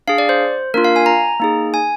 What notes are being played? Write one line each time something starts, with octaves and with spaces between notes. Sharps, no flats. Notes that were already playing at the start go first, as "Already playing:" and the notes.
D4 G#4 F5
D5
C5
A#3 D4 F4 A#4
F5
G#5
A#5
A#3 D#4 G#4
G#5